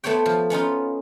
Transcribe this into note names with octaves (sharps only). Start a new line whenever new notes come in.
A3 B3 C5 C#5 G5
F3
B3 C#4 D#4 F4